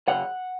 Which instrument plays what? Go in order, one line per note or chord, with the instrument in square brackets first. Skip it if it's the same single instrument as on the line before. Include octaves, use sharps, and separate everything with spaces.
[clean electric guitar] F#2 C#3 F#5